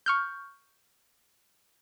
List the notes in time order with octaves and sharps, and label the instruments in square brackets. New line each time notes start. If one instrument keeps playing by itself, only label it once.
[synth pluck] C#6 F6 G6